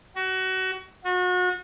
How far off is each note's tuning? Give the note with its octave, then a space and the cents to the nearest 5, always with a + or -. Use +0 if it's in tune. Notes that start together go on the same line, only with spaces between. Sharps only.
F#4 +25
F#4 -35